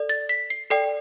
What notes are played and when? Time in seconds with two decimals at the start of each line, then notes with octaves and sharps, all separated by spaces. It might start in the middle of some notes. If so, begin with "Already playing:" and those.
Already playing: A4 D5
0.09 A6
0.29 B6
0.50 C7
0.70 A4 D5 G5 C7